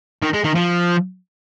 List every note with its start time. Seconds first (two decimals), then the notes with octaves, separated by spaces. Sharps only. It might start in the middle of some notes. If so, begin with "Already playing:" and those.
0.23 D#3
0.34 G#3
0.44 D#3
0.55 F3